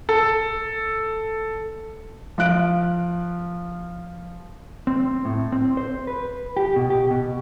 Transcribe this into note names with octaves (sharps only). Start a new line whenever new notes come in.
A4
F3 F5 F#6 D7
C4
A2
C4
C5
B4
G4
B2
G4
B2